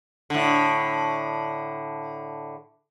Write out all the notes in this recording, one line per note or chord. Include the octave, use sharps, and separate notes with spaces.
A2 D3